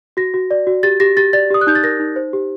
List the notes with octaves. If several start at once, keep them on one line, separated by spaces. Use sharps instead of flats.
F#4 A#6
F#4
D5
F#4
G4 A6
G4 A#6
G4 A6
D5 A6
G4 D#6
F#6
D#4 G6
A6
A#4 A#6
D#4
C5
G4